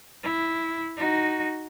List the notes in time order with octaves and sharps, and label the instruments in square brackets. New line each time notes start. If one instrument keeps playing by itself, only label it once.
[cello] E4
D#4 F#4